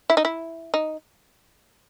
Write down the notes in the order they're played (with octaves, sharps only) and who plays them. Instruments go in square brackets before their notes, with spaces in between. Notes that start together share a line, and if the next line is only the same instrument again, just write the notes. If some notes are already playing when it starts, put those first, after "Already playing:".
[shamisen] E4
D#4
E4
D#4